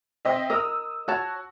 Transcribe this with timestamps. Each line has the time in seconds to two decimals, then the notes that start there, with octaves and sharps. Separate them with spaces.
0.25 C4 D#5 E5
0.50 A#4 D#5 D#6 E6
1.08 F#4 C#5 A5